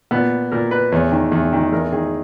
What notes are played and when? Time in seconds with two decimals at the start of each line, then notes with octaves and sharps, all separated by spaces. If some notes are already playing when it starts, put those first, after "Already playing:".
0.11 A#2 B3
0.52 A#2 A#4
0.71 B4
0.92 E2 C#5
1.12 D#3
1.32 E2
1.53 D#3
1.72 E2 A#4
1.92 D#3 G#4